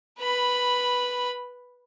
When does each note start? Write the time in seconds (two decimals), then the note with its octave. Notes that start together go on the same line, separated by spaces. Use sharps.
0.19 B4 B5